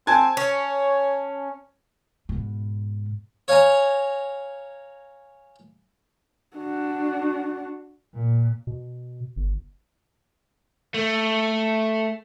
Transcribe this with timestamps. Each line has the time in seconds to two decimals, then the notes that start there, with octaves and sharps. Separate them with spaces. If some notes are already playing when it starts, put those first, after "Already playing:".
0.07 C4 G#5 A5 G#6
0.37 C#4 C#5
2.29 G#2 B2
3.48 C#5 F5 G#5 A#5
6.57 D4 F#4
8.16 A#2
8.67 B2
9.36 G1
10.94 A3